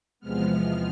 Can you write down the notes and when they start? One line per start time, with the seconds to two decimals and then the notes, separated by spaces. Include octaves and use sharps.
0.20 E2 C3 F3 G#3 B3 F6
0.52 F6